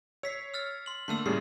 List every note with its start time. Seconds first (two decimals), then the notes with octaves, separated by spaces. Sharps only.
0.23 C#5 E6 B6 C7
0.54 E6 F6 A6
0.86 C6 F#7
1.08 D3 A3 A#3 C6 E6
1.26 A2 C#3 G3 C7